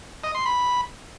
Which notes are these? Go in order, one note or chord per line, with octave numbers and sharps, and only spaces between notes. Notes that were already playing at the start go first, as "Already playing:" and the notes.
D#5
C6
B5